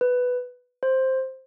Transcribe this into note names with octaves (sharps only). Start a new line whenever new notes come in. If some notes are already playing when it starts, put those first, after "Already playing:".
B4
C5